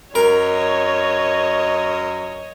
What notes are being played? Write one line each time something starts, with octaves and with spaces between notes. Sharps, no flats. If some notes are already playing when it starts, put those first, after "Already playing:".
F#2 A#4 C#5 D#5